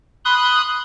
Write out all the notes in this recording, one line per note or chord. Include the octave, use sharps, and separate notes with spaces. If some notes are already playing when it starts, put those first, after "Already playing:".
B5 C6 D#6 F#6